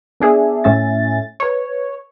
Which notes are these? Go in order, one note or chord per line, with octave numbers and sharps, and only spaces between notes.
B3 D4 G#4 E5
A2 A3 C#4 E5 G#5 A6
B4 C#5